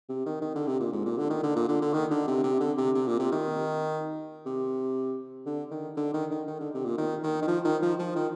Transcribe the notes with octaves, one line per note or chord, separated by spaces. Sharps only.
C3
D#3
D#3
D3
C3
A#2
G#2
A#2
D3
D#3
D3
A#2
D3
D3
D#3
D3
C3
C3
D3
C3
C3
A#2
C3
D#3
C3
D3
D#3
D3
D#3
D#3
D#3
D3
C3
A#2
D#3
D#3
D#3
F3
D#3
F3
F3
D#3